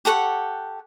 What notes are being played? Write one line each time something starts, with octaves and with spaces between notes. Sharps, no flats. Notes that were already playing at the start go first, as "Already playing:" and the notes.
G4 A4 F#5 C#6